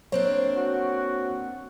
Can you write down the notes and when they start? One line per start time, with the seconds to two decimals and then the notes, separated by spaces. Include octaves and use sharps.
0.12 A#3 C4 D4 C5 C#5
0.57 F#4